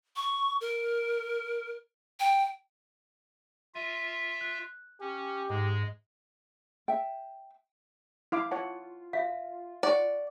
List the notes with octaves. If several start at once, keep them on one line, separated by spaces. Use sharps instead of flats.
C#6
A#4
G5
F4 E5 A#6 D#7
F#6
C#4 G4
G#2 G#3
E5 G5
E4 F5 D6
F4 C#5 F#5 A5
E5 F5
D5 F#5 C#6